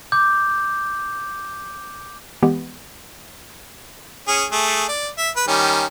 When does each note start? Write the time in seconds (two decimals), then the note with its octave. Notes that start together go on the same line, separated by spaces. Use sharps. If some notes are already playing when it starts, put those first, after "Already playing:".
0.12 D6 G6
2.43 E3 G#3 B3 G4
4.28 C#4 G#4
4.52 A3 G#4
4.88 D5
5.18 E5
5.36 B4
5.48 D#3 G3 C#4